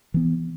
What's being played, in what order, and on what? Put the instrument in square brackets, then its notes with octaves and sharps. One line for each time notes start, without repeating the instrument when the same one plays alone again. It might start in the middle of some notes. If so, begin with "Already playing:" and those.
[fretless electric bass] E3 B3